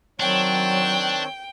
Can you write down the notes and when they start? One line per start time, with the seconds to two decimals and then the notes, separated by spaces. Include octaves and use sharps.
0.20 D#3 F#3 C4 D4 C#5 G5